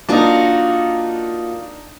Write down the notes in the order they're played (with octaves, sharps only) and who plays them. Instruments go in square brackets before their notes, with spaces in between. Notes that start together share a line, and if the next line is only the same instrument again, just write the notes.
[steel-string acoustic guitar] A#3 F4 F#4 [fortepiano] D4 D#4